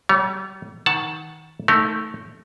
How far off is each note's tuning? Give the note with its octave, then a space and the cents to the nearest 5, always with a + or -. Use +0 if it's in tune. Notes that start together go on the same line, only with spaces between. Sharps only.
G3 -40 C#5 +10
D#3 +25 F#5 +0 A5 +0
A3 +0 D#4 +25 A#4 -25